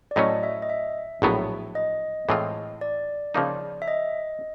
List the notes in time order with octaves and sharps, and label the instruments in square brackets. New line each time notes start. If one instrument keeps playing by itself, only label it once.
[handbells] D5
[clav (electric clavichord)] A2 F#3 A3 C#4 [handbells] D#5
[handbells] E5
D#5
E5
[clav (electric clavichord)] A#1 A2 F#3 B3
[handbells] D#5
[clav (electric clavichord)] A2 E3 G#3 C4 F4
[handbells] D5
[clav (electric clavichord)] C#3 F3 A#3 D#4
[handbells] E5
D#5